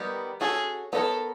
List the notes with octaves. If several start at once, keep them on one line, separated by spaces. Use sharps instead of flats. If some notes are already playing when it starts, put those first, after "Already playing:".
Already playing: D#3 G3 B3 D#4 G4
C#4 F#4 G#4 A4
B3 D#4 F#4 A4 A#4 C#5